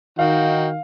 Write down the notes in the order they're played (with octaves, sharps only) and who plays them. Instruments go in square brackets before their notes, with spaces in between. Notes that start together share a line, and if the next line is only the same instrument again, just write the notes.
[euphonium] D#3 [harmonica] D#4 F#4 G5 [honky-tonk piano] F5